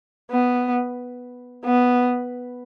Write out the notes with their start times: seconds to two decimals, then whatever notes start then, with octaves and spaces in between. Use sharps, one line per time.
0.31 B3
1.65 B3